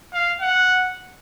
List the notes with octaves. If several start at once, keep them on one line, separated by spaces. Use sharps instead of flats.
F5
F#5